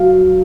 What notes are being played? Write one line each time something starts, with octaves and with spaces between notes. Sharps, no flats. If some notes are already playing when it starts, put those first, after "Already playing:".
Already playing: F#3 F5